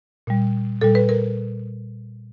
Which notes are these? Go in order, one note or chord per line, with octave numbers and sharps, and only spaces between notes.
A#2 G3
A#2 G3 A4
B4
A#4